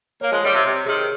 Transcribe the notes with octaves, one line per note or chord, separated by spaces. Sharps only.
A#3 C#5
F3 G#3
D#3 G3 C#5
C3
C3 C6
C3 D#3 G#4